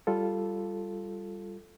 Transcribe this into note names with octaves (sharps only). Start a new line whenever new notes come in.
G3 F4 A4